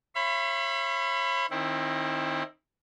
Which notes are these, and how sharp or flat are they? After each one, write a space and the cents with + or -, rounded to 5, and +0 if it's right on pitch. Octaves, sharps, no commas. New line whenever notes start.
C#5 -35 E5 +45 B5 +15
D#3 +0 C4 +35 E4 +5